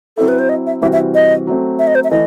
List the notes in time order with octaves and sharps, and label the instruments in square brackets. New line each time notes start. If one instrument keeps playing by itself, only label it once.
[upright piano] F#3 C4 E4 [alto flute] A4
[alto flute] B4
C5
D#5
E5
[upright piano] C3 E3 G3 C4 F#4 [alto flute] E5
[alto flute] E5
D#5
[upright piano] F#3 A3 C4
[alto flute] E5
D#5
C5
E5
[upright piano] E3 A3 E4 [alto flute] D#5